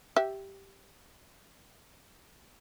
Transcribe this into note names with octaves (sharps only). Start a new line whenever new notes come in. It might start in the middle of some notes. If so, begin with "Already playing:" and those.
G4 E5